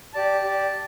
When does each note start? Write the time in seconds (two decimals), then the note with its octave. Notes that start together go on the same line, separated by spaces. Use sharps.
0.13 G4 D5 A5
0.44 G4 D5 A5